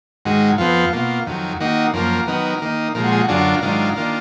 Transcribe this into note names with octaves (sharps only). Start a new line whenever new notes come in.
G#2 D#3 G#3 F#4
F2 F3 B3 F4
B2 A#3 F4
F2 D#3 F#3
D#3 A#3 D#4 F#4
F#2 F3 A#3 A#4
D#3 F#3 B3 D#4
D#3 A#3 D#4
A#2 F3 G#3 A#4
F#4
G#4
F#4
F#2 D3 F#3 D4 F4 G#4
F#4
A#4
G#2 D#3 F#3 D4 F4
D#3 A#3 D4 F4